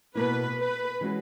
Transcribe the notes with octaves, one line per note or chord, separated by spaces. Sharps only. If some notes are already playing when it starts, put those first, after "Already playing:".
B2 A#3 E4 B4
B4
E3 G#3 C#4 F#4